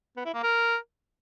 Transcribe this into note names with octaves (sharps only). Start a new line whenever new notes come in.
B3
E4
A#3
A#4